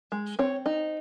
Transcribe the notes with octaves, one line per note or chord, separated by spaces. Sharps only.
G#3
C4 C#5
D#4